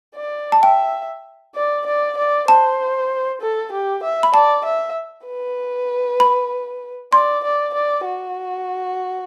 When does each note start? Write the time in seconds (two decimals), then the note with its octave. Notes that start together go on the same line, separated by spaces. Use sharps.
0.16 D5
0.52 A5
0.63 E5 G5
1.55 D5
1.86 D5
2.17 D5
2.48 C5 A5
3.41 A4
3.72 G4
4.03 E5
4.23 B5
4.34 D5 A5
4.65 E5
5.26 B4
6.20 B5
7.13 D5 C6
7.44 D5
7.74 D5
8.05 F#4